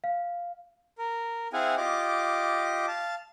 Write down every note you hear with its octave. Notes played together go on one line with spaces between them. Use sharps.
F5
A#4
C4 E4 G#4 F5 F#5 G#5
F4 G4 D#5 D6
F5 A5